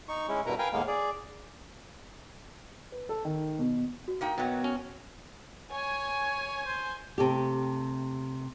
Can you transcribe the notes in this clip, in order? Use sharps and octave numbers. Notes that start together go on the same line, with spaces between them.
D#4 C#6
G#3 C#4 E4
G2 B2 E4 A#4 B4 A#5
A#4 B4 F5 G5 G#5
D#2 A2 G#3 A#3 B3 F5
G#4 D5
B4
A4
D#3
B2
F#4
A#3 D#4 G5
B2 F#3 A#3 B3 G5
C#4
C#5 G#5
C5
C3 A3 G4